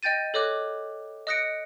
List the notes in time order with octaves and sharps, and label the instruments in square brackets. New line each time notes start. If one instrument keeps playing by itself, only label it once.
[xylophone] D#5 G5 G6 A6 D#7
A4 C#5 D#5 D6 F#6
D#5 D#6 F#6 A#6 C#7 D7